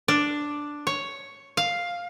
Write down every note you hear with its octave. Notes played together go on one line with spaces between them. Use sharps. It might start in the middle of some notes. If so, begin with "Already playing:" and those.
D4
C#5
F5